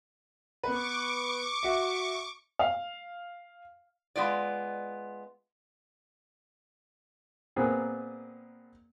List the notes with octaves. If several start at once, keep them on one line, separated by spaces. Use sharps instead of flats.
B3 B4 C#6 D6
F#4 E5
F5
G#3 B3 F4 D5
A#2 B3 C4 G#4 A#4